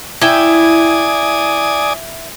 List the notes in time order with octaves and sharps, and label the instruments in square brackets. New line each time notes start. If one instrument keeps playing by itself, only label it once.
[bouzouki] E4 G5 [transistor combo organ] D5 G#5 D#6